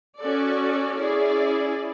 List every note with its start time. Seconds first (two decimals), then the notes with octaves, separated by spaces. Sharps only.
0.19 C#4 F#4 A4 D5
0.97 C#4 E4 G#4 D5